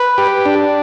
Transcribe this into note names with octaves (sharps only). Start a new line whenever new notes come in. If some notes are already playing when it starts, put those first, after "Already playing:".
Already playing: B4
G4
D4